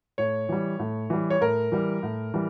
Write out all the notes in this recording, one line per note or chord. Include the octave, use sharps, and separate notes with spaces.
A2 C#5
E3 G3
A2
E3 G3
C#5
A2 A#4
E3 G3
A2
E3 G3